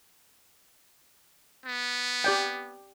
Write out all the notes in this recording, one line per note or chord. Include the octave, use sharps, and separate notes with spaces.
B3
G4 D5 G5